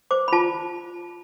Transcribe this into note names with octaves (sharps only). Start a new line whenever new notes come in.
C5 D6
B5
F4 A5